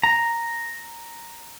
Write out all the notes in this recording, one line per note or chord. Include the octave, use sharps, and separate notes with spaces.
A#5